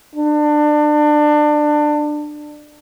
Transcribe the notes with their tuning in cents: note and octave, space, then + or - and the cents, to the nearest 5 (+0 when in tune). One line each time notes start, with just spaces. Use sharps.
D4 +25